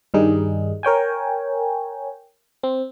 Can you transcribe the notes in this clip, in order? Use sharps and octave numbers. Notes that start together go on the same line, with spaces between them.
G2 D#3 G3 D#4 G#4
A#4 C#5 G5 G#5
C4